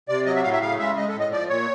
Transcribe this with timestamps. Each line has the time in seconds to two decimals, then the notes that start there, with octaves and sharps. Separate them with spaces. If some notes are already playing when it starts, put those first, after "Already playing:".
0.09 C3 D5
0.26 F#3 D#5
0.35 E5
0.43 A2 F5
0.53 E5
0.61 C#3 F5
0.79 G#3 E5
0.96 G#3 D#5
1.09 A4
1.14 A2
1.19 D#5
1.32 F3 D5
1.49 A#2 C#5